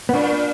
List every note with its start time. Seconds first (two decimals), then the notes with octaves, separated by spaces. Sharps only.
0.09 B3
0.14 A#2 D4